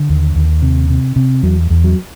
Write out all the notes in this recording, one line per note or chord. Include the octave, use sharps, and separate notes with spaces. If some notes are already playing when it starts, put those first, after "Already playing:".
Already playing: D3
D#2
D#2
C3
C3
C3
E2 F#3
E2
F#3